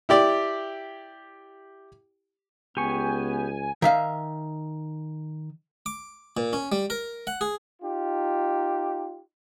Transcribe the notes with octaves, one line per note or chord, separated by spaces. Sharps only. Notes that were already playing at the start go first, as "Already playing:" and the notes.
E4 G4 D5
C#2 B3 G4 G#5 C#6
D#3 E5 F5
D6
A#2
C#4
G3
A#4
F#5
G#4
D#4 F4 G4